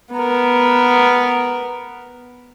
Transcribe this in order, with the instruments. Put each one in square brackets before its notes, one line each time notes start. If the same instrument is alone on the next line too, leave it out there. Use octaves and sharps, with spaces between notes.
[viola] B3 A#4